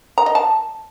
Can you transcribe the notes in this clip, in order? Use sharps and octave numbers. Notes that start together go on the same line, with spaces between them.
A#5
D#5
A5